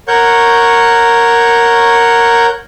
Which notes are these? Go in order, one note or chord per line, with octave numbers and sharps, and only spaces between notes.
A#4 C#5 F#5 C#6 G6